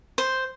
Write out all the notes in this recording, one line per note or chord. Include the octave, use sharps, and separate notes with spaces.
C5